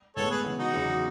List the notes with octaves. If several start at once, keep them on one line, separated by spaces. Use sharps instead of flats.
A2 G#3 B3 A4 C#5
G#4 B4
C#3 E3 B3
D#4 F#4
E2 C#3 F#3